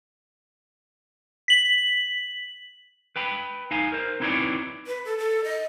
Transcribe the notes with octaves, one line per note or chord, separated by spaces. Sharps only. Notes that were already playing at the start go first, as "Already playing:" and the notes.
B6 F#7
B4 G5 B5
D#4 F5 G#5
A#4 C5
C4 D#4 E4 B4 C#5 D5
B4
A4
A4
D#5